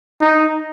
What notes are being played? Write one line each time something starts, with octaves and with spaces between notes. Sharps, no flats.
D#4